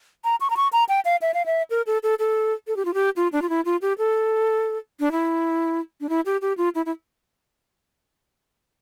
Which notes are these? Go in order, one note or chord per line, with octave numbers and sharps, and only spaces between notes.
A#5
C#6
A#5
C#6
A#5
G5
F5
E5
F5
E5
A#4
A4
A4
A4
A4
G4
F4
G4
F4
D4
F4
E4
F4
G4
A4
D4
E4
D4
E4
G4
G4
F4
E4
E4